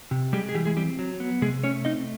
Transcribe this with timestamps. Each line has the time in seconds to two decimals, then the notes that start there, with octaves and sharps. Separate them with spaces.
0.11 C3
0.33 G3 G#3 G4
0.49 G#4
0.55 E3 G3 G4
0.65 G#3 G#4
0.77 G3 C4 G4
0.99 F#3
1.20 B3
1.42 C3 G#3 G#4
1.63 A3 C#4 C#5
1.85 C4 D#4 D#5